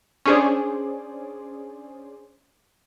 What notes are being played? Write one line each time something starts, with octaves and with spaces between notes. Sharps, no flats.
C#4 D4 G#4 C5 D5